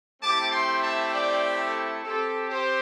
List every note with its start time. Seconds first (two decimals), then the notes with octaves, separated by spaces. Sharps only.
0.22 A3 C4 E4 G4 A5 D6
0.52 G5 C6
0.82 E5 A5
1.12 D5 G5
1.58 A4
2.02 C4 G4 A4
2.48 G4 C5